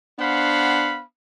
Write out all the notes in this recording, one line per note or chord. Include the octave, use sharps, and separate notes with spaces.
B3 D4 C5 F5 F#5 B5